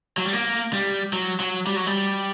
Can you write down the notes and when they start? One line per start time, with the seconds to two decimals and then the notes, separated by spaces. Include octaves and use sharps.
0.18 F#3
0.25 G3
0.33 A#3
0.73 G3
1.13 F#3
1.40 F#3
1.67 G3
1.76 F#3
1.86 G3